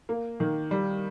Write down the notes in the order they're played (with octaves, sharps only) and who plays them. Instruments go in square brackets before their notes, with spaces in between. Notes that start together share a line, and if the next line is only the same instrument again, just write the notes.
[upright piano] A#3
D#3
G3